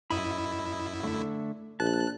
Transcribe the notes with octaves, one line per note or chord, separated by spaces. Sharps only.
F#2 E4 D#5 B5
D3 A3
A#1 A5 F#6